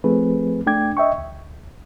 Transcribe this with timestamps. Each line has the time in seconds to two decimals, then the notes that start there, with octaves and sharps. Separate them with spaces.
0.04 F3 A3 C4 G#4 B4
0.67 A3 D4 G5 D6 G#6
0.97 D#5 E5 G5 C#6
1.18 D2